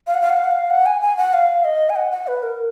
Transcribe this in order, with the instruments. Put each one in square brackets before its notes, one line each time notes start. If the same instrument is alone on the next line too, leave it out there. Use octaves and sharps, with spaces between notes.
[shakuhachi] F5
F#5
F5
F#5
F5
F#5
F5
F#5
G#5
G#5
F#5
F5
D#5
G#5
F#5
F#5
B4
A#4